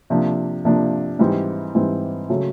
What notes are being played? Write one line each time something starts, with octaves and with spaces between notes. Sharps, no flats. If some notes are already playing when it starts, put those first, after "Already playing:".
C3 F3 A#3 D4
C3 F3 A#3 D4
G#2 E3 G3 C4
G#2 E3 G3 C4
C#3 F#3 A3